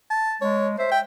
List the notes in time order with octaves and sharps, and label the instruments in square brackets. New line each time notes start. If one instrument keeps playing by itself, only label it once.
[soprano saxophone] A5
[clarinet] G#3 [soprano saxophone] C#5
[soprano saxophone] C5 [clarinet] E5
[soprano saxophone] G5